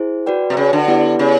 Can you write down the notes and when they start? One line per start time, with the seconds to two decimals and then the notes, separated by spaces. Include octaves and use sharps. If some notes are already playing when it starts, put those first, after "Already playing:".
Already playing: E4 G#4 C5
0.26 F#4 B4 D5 G5
0.50 C3
0.57 C#3
0.73 D3
0.88 B3 E4 G4 B4 D5
1.19 C#3